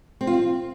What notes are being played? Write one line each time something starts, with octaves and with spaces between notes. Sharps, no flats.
C4
F4
C4